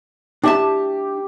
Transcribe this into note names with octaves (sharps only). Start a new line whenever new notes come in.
D4 G4 E5 A5